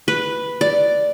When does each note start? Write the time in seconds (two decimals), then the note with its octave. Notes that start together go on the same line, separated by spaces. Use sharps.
0.08 B4
0.61 D5